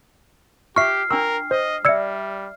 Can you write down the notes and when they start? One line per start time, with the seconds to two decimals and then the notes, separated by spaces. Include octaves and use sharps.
0.76 F4 G4 E5 C#6 F6 C7
1.11 D4 A#4 G5 C#6 E6
1.51 C5 D#5
1.85 G3 D5 E5 E6 G#6 C#7